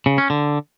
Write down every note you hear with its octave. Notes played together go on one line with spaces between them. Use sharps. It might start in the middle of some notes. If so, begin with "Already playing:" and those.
C#3
C#4
D3